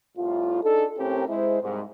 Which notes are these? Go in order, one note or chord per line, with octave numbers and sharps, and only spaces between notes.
C2 A2 F4
D4 D#4 G#4 A4
A2 C4 C#4 G4 A#4
G#3 E4 C5
C2 G#2